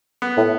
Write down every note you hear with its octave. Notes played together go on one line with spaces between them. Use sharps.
B3
A2